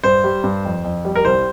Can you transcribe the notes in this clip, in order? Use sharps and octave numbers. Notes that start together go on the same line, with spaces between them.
G2 C5
G3
G2
F2
F2
G3
A#4
C2 C5